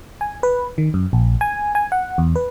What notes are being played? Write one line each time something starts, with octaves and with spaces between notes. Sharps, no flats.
G#5
B4
D#3
F#2
A#1
G#5
G#5
F#5
E2
B4